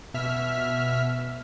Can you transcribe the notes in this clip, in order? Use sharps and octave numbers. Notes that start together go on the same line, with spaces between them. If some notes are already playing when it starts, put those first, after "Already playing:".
B2 E5 F6 B6